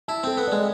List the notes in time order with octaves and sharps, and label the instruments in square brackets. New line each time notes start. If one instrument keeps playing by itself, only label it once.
[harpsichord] E4 [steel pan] A5
[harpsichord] C4 [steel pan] A4
[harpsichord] B3
[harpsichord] G#3 [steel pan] D5